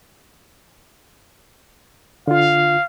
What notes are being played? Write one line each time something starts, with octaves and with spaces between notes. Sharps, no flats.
D3 F4 F5